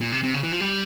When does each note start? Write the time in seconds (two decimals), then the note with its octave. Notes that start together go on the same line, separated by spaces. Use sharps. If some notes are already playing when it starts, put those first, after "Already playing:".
0.01 A#2
0.12 C3
0.24 C3
0.34 C#3
0.43 E3
0.52 F3
0.60 G3